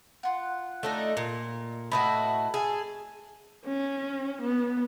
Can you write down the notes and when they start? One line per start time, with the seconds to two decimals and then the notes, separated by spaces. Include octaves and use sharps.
0.23 F4 F#5
0.83 A3 D4 D#4
1.17 A#2
1.92 A2 E4 F#4 B4 D#5 A5
2.54 G#4 A4 G#5
3.66 C#4
4.41 B3